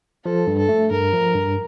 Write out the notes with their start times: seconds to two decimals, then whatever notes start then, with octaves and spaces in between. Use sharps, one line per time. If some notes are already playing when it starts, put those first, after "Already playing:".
0.25 F3 A4
0.47 G2
0.58 A4
0.69 A3
0.91 G2 A#4
1.13 F3
1.35 G2